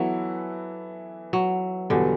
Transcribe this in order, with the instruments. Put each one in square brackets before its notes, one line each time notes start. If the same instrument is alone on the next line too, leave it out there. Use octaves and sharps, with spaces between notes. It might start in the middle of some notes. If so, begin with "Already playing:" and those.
Already playing: [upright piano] E3 B3 E4 A4 [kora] F#3
[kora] F#3
[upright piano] E2 B2 G3 [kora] D3